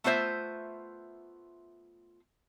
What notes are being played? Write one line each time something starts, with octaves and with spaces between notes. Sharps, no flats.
A3 B3 F4 C5 E5